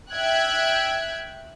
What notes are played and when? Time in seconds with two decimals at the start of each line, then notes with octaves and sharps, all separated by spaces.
0.11 E5 G5 F#6 G#6